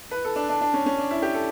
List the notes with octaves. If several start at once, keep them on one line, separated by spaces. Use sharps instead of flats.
B4
A4
D4
D4
D4
C#4
C#4
D4
E4
G4
A4